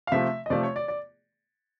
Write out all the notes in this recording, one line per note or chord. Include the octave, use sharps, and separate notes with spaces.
F5
C3 F3 A3 E5
D#5
C3 F3 A3 D5
C#5
D5
D5